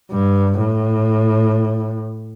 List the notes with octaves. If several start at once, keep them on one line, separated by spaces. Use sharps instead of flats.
G2
A2